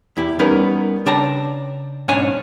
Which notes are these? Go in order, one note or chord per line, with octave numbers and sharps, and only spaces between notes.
E2 E4 G4
G3 B3 C#4 D#4 A#4 B4
C#3 D4 G5 A5 A#5
B1 G#2 C#4 D4 C#5 G#5